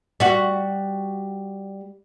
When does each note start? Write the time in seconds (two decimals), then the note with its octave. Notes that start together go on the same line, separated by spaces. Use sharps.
0.20 G3 F#4